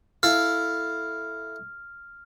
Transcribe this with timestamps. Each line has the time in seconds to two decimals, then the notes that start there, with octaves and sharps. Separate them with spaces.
0.23 E4 A4 F5 F6